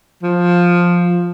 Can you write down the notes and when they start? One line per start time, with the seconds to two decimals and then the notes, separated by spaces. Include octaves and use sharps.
0.23 F3